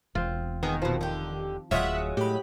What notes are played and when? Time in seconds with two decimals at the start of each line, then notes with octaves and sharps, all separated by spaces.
0.15 E1 C4 F4
0.63 D#3 B3 G#4 A#4
0.82 B2 F3 C4
1.01 D3 G4
1.71 D1 F#3 G#3 F4 C#5 E5 F#5
2.17 A2 G4 B5